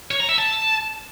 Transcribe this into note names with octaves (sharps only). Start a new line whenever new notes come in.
C#5
A#5
E5
A5